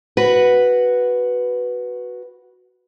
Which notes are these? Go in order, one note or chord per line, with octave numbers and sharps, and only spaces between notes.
F#4 B4